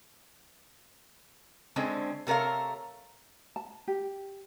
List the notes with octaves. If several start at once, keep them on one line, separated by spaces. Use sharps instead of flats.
D3 G#3 C4 C#4 C5
C3 A3 A#4 C#5 F5
A5
G4